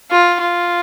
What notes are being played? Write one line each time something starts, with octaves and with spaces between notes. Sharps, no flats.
F4
F4